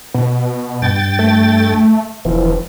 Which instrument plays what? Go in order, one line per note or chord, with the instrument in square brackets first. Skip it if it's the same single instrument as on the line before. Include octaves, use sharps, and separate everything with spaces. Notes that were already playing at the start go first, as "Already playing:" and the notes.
[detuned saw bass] B2
[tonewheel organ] G2 G5 A6
[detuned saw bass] A3
[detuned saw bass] E1 [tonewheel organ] E3 F3